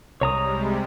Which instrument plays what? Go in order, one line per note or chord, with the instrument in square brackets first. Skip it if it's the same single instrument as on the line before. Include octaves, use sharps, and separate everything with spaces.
[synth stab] C2 [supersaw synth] C3 G3 G#3 [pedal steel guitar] C#5 A#5 D#6